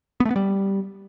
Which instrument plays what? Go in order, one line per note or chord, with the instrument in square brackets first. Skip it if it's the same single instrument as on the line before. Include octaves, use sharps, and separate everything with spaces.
[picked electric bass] B3
A3
B3
G3